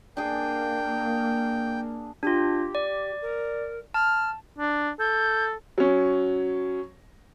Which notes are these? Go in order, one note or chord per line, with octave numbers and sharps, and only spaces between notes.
A#3 D4 G#4 G5
D4 F4 G4
D5
A#4
A5 F6
D4
A4 G6
F#3 C#4